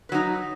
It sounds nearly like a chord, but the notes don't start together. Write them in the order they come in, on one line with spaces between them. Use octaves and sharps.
B4 F#3 D#4